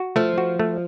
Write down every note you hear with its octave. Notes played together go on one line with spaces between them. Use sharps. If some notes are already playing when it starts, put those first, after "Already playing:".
Already playing: F#4
F3 A3
F#4
A3